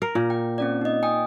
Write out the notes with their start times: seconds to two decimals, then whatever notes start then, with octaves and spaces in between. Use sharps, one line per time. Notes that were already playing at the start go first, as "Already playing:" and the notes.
0.02 A#4
0.15 A#2
0.30 G5
0.58 C4 C#4 D5
0.81 D#4 D#5
1.03 G5 G#5 D#6